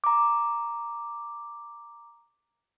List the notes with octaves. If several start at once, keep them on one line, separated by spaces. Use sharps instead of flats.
A#5 D6